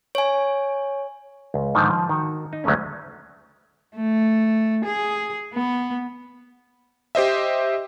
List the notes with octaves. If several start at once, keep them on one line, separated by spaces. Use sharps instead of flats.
C#5 G#5
C#2
G#2 D3 D#3 F3
F3
D#3 F#4
D#4
D2 F#3 G#3 A3 C#4
A3
G#4
B3
G4 C5 D#5 E5